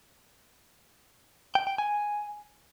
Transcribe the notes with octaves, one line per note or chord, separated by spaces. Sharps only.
G5
G5
G#5